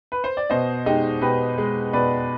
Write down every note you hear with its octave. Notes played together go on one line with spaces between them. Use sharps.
B4
C5
D5
B2 C5 D#5
G#3 D#4 G4
B2 G4 B4
G#3
B2 B4 D5